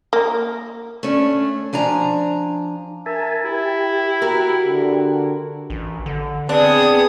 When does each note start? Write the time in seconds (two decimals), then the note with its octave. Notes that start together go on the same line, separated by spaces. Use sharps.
0.13 A#3
1.03 A3 C#4 D4
1.73 F3 D4 G#5 A#5
3.06 A#4 E5 G#5 A5
3.44 E4 G4
4.22 F#4 A#4
4.64 D3
5.70 A1
6.06 D3
6.49 B3 C4 D4 G#4 D#6